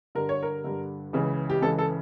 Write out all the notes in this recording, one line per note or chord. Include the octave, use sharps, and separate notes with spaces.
G2 D3 A#4
C#5
A#4
G2 D3
C#2 C#3 E3
G4
C#2 C#3 E3 A4
A4